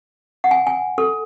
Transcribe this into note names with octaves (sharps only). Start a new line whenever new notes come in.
F#5
G#5
G#5
A4